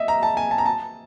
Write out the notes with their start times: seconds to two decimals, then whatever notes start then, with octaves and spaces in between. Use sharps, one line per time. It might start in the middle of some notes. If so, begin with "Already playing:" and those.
Already playing: D#5 E5
0.08 A#5
0.23 A5
0.37 G#5
0.51 A5
0.58 A#5
0.66 A5